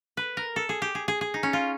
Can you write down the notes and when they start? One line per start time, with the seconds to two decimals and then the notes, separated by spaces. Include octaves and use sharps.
0.17 B4
0.37 A#4
0.56 A4
0.69 G#4
0.82 G4
0.95 G#4
1.08 G#4
1.21 G#4
1.34 D#4
1.43 C#4
1.53 F4